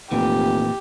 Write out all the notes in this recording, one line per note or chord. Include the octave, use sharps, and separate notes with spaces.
F1 A#2 E3 G4